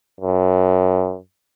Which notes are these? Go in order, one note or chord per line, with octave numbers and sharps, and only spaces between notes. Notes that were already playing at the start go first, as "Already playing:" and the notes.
F#2